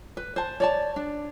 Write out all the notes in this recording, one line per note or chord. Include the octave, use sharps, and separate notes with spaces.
B4
C5 A5
C#5 D5 A5
D4